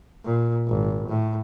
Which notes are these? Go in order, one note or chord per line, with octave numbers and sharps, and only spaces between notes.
A#2
G#1
A2